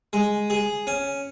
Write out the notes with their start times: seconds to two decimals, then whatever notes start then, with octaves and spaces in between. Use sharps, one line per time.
0.13 G#3
0.50 G#4
0.87 C#4